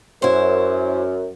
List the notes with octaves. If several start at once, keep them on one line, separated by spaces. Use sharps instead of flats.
F#2 E4 C5